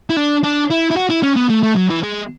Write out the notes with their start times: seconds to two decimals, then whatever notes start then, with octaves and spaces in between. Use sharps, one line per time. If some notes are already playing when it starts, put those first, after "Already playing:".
0.10 E4
0.16 D4
0.43 D4
0.70 E4
0.91 E4
0.96 F#4
1.10 E4
1.23 C#4
1.36 B3
1.50 A3
1.63 A3
1.76 F#3
1.90 E3
2.03 G#3